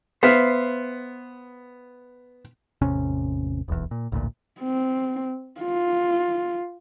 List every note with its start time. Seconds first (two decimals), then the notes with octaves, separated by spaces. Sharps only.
0.23 B3 C5 E5 F5
2.82 A1 E2 C3 C#4
3.68 D#1 B1 E2
3.91 A#2
4.12 A1 D2 A#2
4.60 C4
5.61 F4